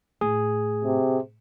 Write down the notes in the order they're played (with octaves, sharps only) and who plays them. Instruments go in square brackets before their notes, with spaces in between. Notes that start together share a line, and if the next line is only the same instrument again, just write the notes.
[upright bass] A2 [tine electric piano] G#4
[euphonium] C3